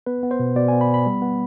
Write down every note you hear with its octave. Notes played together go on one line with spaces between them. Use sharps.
B3 B4
B3
C5
B2
B2 D5
B3 G#5
B5
B3
B5
G3
B3